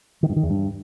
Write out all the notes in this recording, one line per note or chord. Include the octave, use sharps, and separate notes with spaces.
D#3
G2
D#3
E2
G2